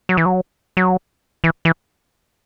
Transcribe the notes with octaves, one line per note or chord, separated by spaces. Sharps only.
F#3
E3
F#3
F#3
E3
E3